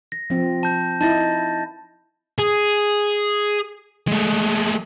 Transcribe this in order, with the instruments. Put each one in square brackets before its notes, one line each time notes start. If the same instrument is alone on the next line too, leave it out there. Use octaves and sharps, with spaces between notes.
[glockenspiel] A#6
[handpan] F3 C4
[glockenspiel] A5 G6
[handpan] D#4 E4 [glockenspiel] A5 A6 A#6
[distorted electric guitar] G#4
G#3 A3